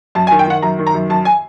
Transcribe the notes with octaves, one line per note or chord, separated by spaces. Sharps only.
F#2 A5
G#5
D#3
G5
D#3 F#5
F#2 A#5
D#3
A#5
F#2
F#2 A5
G#5